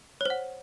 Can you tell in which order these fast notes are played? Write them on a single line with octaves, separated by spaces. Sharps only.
C#5 C5 F#5